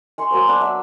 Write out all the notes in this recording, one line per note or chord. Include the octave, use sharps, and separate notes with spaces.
G#5 C6 C#6
F#3 A#3 C5
B3 D4
E5